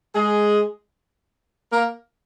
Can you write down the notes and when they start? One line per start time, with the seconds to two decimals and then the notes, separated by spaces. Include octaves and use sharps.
0.14 G#3 G#4
1.72 A#3 A#4